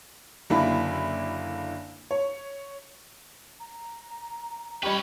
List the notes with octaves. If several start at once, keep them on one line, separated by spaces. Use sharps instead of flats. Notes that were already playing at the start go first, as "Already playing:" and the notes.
F#1 D3 A#3 D4 E4 B5
C#5
A#5
G3 C#4 G4 B4 D#5 B5 C#6